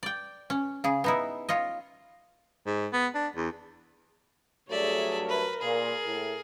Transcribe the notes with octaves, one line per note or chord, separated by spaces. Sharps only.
D5 G5
C#4
C#3 G#4
B3 D#4 E4
F4 C#5 D#5
G#2
B3
D4
E2
G2 F#3 A3 G#4 C#5 D5 E5
A#4 B4
A#2 G#4
A2